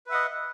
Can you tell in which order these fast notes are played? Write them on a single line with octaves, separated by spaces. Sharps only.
B4 E5 F#5 D#5